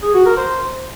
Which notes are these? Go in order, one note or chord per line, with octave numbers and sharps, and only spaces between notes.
G#4
F#4
A#4
C5